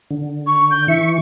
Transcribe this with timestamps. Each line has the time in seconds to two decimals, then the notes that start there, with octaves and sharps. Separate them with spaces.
0.11 D3
0.46 C#6
0.71 G6
0.88 E3 E5 C#6